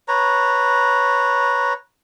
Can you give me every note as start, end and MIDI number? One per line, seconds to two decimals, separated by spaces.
0.08 1.73 71
0.08 1.73 73
0.08 1.73 82